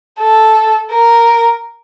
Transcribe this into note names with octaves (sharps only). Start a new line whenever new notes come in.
A4
A#4